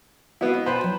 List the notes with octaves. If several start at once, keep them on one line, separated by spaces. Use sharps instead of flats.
B3 E4 F#4 F5
D#5
B2 B4 C5 G5 A5 B5
F#3